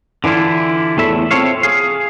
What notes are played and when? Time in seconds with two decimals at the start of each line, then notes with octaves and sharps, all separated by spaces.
0.24 D3 E3 D4 E4 F4
0.97 E2 A2 A4 E5 B5
1.31 C4 F4 A4 C#5 F5
1.63 G#4 F5